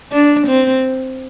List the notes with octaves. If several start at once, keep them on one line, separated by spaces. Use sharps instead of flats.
D4
C4